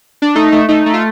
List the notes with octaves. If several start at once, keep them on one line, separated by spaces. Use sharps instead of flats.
D4
A3 D#4
A3
A3 D#4
A3
F4